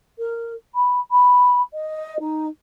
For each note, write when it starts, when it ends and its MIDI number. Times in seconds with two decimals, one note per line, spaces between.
0.18 0.52 70
0.74 0.99 83
1.11 1.61 83
1.73 2.19 75
2.19 2.46 63